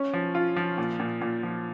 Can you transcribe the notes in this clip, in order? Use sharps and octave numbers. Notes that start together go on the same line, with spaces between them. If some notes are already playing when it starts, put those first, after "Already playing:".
Already playing: C#4
F3
F4
F3
A#2
A#2
A#2
F3